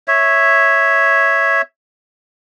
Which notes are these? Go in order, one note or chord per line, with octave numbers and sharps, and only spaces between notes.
C#5 E5